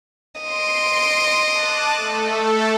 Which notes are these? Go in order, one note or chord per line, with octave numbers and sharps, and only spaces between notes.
D#5 C6 D7
A5 D6 F#6
A3 A4